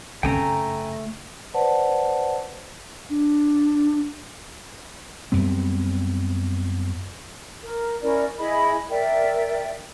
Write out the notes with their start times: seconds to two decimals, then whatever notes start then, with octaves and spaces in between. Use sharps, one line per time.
0.23 F#2 C#3 A3 C4 C#4 G5 G#5 A#5
1.54 B4 C5 D5 F#5 A5
3.10 D4
5.32 F#2 G3 B3 C4
7.63 A#4
8.02 C#4 E4 A#4 D5
8.38 E4 G#4 D#5 B5
8.90 A#4 D5 E5 G5